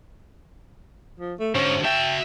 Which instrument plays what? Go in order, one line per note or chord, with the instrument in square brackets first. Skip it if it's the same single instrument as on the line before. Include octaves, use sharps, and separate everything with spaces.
[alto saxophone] F3
A3
[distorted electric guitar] G#2 [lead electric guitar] D3 C5 [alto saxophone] C#4
[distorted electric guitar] F#4 A5 [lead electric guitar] E5 [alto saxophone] G5